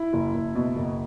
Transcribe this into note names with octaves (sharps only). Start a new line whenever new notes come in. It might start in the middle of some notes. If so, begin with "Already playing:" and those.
Already playing: E4
F#1
F#1
B2
F#1